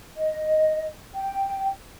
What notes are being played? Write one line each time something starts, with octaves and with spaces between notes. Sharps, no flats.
D#5
G5